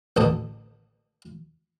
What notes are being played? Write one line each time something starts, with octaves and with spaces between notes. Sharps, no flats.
A1 D2 A4 D#6